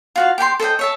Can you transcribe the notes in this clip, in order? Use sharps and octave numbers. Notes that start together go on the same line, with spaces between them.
F4 F#4 F5
G4 G5 G#5 C6
A4 C5 D#5 G5
C#5 E5 A5